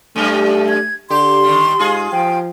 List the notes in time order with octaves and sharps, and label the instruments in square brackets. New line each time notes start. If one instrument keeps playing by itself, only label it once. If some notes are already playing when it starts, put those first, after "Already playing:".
[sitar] F#2 G3 [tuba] A3
[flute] G#6
[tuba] D3 [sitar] G4 [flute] C6
[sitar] D#3 G3
[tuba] G#2 [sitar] F4 G#4
[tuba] F3 [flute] G5